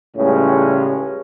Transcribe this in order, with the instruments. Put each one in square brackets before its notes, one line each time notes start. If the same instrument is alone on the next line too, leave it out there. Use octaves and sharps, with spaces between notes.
[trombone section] C#2 A2 C#3 G3 G#3 C#4